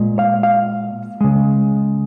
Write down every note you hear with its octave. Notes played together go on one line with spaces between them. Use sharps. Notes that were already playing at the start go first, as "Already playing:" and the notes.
Already playing: A#2 G#3
F5
F5
C#3 G#3